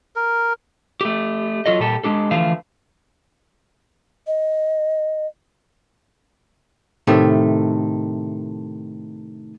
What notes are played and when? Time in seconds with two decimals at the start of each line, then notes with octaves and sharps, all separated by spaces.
0.16 A#4
1.01 A3 G4
1.66 F#3 F4 A4 D#5
1.80 A#2 G3 G4 A4
2.04 G#3 D4 G4 A4
2.31 D3 E3 F3 A3 F5
4.27 D#5
7.07 A2 C3 D#3 A3